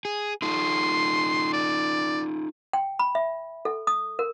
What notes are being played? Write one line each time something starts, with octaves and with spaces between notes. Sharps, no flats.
G#4
D#4 F4 A4 C6
D5
G5
B5
E5
A4
D#6
A#4